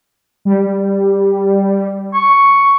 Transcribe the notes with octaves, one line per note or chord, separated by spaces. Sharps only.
G3
C#6